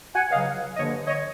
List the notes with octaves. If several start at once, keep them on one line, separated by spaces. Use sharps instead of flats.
F#5 G#5
C#2 C#3 F#3 D#5 F5
G2 D3 F3 A#3 C#5 D#5
C#5 D#5